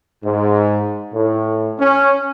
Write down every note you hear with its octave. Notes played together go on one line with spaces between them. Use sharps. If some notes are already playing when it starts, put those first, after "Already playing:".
G#2
A2
C#4